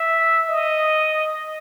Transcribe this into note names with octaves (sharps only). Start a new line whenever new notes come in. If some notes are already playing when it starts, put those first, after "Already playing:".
Already playing: E5
D#5